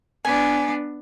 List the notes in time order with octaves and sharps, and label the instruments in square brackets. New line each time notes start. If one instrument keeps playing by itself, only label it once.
[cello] B3 D4 [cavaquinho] G#5